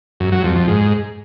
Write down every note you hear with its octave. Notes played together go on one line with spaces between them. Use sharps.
F#2
F#3
F2
F2
G#2